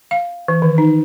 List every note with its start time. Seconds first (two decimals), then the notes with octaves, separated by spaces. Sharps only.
0.11 F5
0.48 E3
0.62 D#3
0.78 D#4